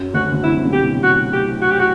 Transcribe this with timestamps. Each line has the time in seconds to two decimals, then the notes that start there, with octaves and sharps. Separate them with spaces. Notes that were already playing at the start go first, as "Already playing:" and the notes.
Already playing: F#2 F#3
0.13 D2 D3 F#4
0.32 D3
0.43 C2 C3 E4
0.65 A2
0.73 B2 G4
1.03 F#4
1.33 G4
1.62 F#4
1.71 G4
1.79 F#4